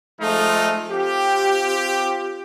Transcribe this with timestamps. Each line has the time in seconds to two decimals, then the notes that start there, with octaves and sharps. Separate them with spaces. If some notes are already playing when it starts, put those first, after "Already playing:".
0.20 F3 G#3 A3 D#4 F4
0.91 C4 F4 G4